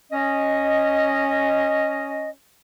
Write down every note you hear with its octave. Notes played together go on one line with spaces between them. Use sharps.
C#4 D#5